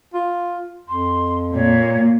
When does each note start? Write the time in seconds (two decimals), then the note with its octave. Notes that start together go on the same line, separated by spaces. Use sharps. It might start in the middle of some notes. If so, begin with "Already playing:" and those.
0.14 F4
0.88 F2 C6
1.54 A#2 C#5